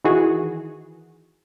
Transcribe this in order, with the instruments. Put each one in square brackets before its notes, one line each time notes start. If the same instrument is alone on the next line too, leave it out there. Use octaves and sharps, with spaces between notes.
[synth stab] D#3 E3 F#4 G#4